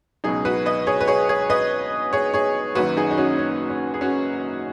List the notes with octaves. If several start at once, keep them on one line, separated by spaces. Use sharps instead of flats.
C#2 B2 F#3 D#4 G#4
F#4 B4
B4 D#5
G#4 C#5
B4
G#4 C#5
G#4 C#5
B4 D#5
G#4 C#5
G#4 C#5
F#1 F#2 D#3 F#3 F#4 B4
D#4 G#4
D#4
C#4 F#4
C#4
C#4
G#4
C#4 F#4